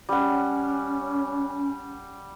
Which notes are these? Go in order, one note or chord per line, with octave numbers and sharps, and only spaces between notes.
G3 C#4 F#5